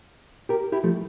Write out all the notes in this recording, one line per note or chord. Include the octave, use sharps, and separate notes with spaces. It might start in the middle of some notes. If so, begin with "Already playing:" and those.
G4 A#4
E4 G4
F3 A3